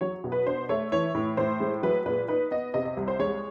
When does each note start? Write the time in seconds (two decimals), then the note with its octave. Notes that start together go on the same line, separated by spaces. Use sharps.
0.01 F#3 C#5
0.24 B2
0.32 B4
0.46 D4 C5
0.69 A3 C#5
0.92 E3 C#5
1.15 A2
1.37 A2 C5
1.60 G#3
1.83 F#3 B4
2.06 A#2 B4
2.28 D#4 B4
2.51 B3 D#5
2.74 C3 D#5
2.85 D#5
2.97 C2
3.08 C5
3.20 G#3 C#5